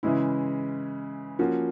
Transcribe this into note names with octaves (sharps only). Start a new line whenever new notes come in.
C#3 E3 G#3 C#4 E4
F3 A#3 C#4 F#4